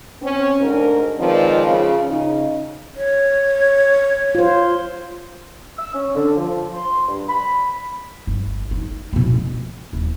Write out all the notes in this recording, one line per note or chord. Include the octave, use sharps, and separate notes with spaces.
C4 C#4
D2 G#2 D4 A#4
D#3 F3 G#3 C4 B4 D5
C#3 F3
C#3 D#4
C#5
F4 C5
E6
C#4
D3
F3
C6
G2
B5
G1
D#4
B2 C#4
F3
D#1